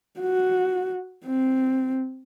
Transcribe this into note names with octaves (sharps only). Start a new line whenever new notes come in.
F#4
C4